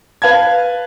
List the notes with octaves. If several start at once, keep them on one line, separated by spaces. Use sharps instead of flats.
B4 F5 A5 G#6